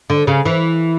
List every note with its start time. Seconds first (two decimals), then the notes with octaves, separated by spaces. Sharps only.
0.10 D3
0.27 C#3
0.45 E3